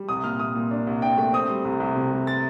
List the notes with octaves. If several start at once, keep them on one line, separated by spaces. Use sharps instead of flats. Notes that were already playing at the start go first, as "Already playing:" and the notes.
Already playing: G3
C2 D#6
A#2 F6
A#2 D#6
A#2
D4
C2
D4 G5
A3 G5
C4 D#6
G3
C2
C2
C3
G3
A6